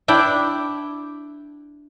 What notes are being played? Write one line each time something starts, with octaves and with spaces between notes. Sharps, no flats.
D4 E4 G5